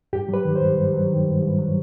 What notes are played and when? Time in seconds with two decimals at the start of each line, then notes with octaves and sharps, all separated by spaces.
0.13 G2 G4
0.29 F#3
0.34 B4
0.45 D#3
0.56 C5
0.61 G2
0.77 G2
0.93 F#3
1.10 D#3
1.26 G2
1.42 G2
1.58 F#3